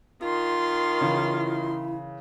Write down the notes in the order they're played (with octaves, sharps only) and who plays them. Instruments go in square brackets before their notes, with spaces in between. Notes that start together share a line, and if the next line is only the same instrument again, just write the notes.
[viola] D#3 C6 [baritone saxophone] F4
[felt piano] C#3 E3 [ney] E4